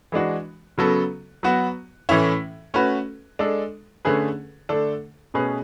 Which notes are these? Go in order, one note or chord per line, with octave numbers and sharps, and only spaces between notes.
E3 G#3 D4 F#4
C#3 F#3 B3 F#4 A4
F#3 B3 F#4
A2 E3 A3 C#4 E4
A3 C#4 F#4 B4
G#3 D4 A4
D3 A3 C#4 G#4 B4
D3 A3 D4 A4
B2 A3 C#4 G#4 B4